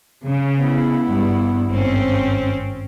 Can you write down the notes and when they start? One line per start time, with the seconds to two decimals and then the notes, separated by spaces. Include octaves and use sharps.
0.24 C#3
0.59 B3 E4
1.07 G2
1.70 G#1 C4 C#4